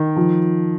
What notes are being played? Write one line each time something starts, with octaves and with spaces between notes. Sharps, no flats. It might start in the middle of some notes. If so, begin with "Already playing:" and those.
Already playing: D#3
F3